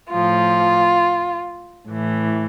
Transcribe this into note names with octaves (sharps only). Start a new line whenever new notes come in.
A2 F3 F4
A2 E3